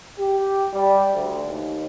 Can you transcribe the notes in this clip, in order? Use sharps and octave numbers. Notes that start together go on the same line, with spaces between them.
G4
G3
D2
D#2